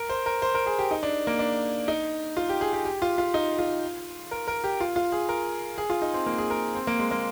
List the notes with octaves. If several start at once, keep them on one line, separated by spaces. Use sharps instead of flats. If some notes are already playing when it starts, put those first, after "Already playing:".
Already playing: A#4
C5
A#4
C5
A#4
G#4
G4
D#4
D4
A#3
D4
D#4
F4
G4
G#4
G4
G4
F4
F4
D#4
F4
A#4
A#4
G4
F4
F4
G#4
A#4
G#4
F4
D#4
C4
A#3
G#4
A#4
C4
A#3
G#3
A#3